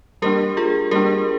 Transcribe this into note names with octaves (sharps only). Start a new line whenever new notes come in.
G3 A#3 D4 G4 A#4
F4 G#4
G3 A#3 D4 G4 A#4